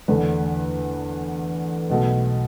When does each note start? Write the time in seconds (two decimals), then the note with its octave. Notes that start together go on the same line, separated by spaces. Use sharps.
0.08 E2 D3 A3 B4
1.89 B1 B2 A3